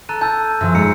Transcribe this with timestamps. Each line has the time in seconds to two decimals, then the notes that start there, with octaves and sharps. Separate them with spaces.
0.09 A4 A#5 F#6 D#7
0.21 A5 E6 G6
0.61 F#2 F3
0.75 G#2 A#5 C#7